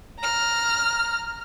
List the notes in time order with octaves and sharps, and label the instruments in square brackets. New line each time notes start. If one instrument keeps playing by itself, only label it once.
[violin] A#5 F6